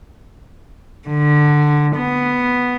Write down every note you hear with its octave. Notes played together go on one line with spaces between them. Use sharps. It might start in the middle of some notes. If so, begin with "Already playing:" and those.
D3
B3